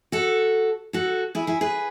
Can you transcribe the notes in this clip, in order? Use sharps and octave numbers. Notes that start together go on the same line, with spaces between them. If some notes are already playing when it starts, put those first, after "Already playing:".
F#4 A4
F#4 A4
E4 G#4
E4 G#4
G#4 B4